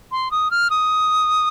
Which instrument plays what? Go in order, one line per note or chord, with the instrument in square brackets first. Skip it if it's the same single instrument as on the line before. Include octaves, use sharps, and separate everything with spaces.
[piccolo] C6
D#6
F6
D#6